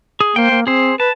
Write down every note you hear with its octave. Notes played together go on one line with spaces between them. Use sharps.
G#4
A#3 C5 G5
A#3
C4 G#4 C5
B4 A5